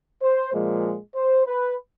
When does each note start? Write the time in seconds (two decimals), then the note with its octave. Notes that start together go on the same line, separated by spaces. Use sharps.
0.22 C5
0.53 A#2 F3 G#3
1.16 C5
1.46 B4